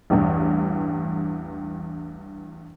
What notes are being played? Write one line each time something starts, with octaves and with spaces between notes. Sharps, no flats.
A1 E2 G2